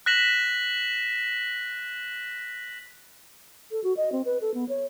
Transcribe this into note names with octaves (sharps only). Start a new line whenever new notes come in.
F#6 A#6 B6 E7 F#7
A4
F#4
D#5
C4
B4
A4
B3
C#5